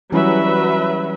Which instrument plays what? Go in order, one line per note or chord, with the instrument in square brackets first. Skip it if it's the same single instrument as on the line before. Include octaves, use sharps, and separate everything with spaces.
[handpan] E3 G3 C#4 [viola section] F#3 B4 E5